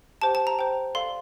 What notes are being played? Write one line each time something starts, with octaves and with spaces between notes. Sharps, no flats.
G4 C5 G5 A5
A5
A#5
C5 G5
A4 D5 F5 C6